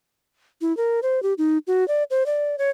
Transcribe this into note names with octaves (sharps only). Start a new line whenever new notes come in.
E4
A#4
C5
G4
D#4
F#4
D5
C5
D5
C#5